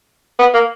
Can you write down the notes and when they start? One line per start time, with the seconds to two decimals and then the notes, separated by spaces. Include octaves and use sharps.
0.39 B3
0.54 A#3